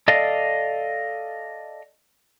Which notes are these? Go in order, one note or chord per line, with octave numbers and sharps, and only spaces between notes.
A4 D5 D#5 F5